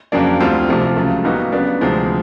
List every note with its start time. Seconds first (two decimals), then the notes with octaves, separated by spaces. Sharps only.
0.12 F2 C#3 F#3 A#3 D4
0.40 D2 D3 G3 C4 F4
0.69 C2 C3 F3 A3
0.96 C#2 C#3 F#3 A3
1.24 A#2 G3 B3 D#4 F#4
1.52 C#3 F#3 B3 D4
1.81 D2 C3 F3 G#3